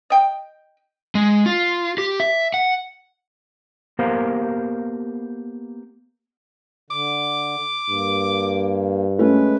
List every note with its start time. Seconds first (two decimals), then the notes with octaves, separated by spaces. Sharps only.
0.10 D#5 G5
1.15 G#3
1.46 F4
1.98 G4
2.20 E5
2.54 F#5
3.99 A#3 B3 G4 A#4 C5 F5
6.90 D3 D6
7.90 G2 A#3
9.19 G#3 A3 C#4 B4